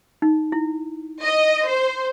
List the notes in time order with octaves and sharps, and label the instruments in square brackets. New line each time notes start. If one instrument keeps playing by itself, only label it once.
[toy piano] D#4
E4
[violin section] D#5
C5